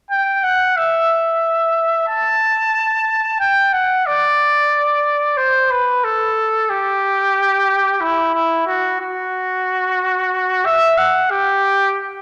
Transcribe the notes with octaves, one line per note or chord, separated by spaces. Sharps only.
G5
F#5
E5
A5
G5
F#5
D5
C5
B4
A4
G4
E4
E4
F#4
F#4
E5
F#5
G4